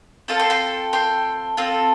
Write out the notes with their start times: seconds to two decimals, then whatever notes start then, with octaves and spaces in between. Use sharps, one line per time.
0.28 C4 F4 A4 F5 A5
0.40 G5 C6
0.50 G5 C6
0.93 G5 C6
1.57 C4 F4 A4